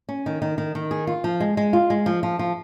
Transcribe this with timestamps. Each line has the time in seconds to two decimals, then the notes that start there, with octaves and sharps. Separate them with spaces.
0.09 C#4
0.26 D#3
0.42 D#3
0.58 D#3
0.75 D#3
0.91 G#4
1.07 F4
1.24 F3
1.40 G#3
1.57 G#3
1.73 F4
1.90 G#3
2.06 F3
2.23 F3
2.39 F3